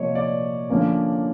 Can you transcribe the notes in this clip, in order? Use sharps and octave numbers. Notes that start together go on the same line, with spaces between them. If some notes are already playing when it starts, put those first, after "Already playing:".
Already playing: C3 F3 A#3 C#5 D#5
D5
D3 F3 A#3 C#4